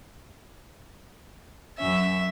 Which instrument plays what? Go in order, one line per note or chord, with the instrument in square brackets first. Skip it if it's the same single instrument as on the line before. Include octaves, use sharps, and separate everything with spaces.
[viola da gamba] F#2 C#4 [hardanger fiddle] E5